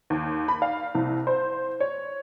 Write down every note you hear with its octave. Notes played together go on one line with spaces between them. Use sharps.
D#2
B5
F5
C2
C5
C#5